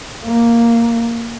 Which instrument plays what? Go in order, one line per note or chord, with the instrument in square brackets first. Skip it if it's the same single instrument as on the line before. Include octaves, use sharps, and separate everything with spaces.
[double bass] A#3